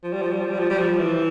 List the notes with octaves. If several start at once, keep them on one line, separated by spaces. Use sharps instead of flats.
F3
G3
F3
G3
F3
G3
F3
G3
F3
E3